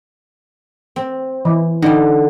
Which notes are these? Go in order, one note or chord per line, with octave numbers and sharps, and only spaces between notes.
C4
E3
D3 G3 D#4